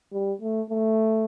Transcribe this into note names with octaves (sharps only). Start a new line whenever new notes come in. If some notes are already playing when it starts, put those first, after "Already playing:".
G3
A3
A3